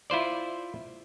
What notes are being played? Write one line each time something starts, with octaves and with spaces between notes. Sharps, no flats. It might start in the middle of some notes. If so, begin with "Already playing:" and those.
E4 F4 C5 D5